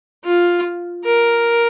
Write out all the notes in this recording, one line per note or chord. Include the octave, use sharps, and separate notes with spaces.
F4
A#4